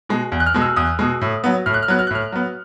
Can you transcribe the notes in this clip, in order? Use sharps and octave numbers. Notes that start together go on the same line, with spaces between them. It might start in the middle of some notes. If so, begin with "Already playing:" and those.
B2 G#3
E2
F#6
F6
B2 G#3
E6
E2 D#6
B2 G#3
A2
F#3 B3
A2 F6
F#6
F6
F#3 B3 F#6
F6
F#6
A2 F6
F#3 B3